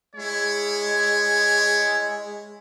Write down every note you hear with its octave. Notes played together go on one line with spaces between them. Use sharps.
G#3 E4 C#5